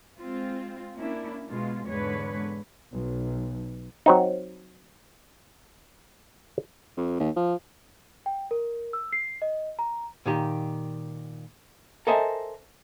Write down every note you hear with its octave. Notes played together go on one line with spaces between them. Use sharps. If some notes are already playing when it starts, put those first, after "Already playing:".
G#3 C4 F4
A#3 C#4 D4 E4
B2 G#3 F4
E2 G#2 D3 G#3 B4 C#5
B1
F#3 C4 D#4
F2
D#2
F3
G5
A#4
E6
C7
D#5
A#5
A#2 D#3 G4
A4 A#4 C5 D#5 E5 G#5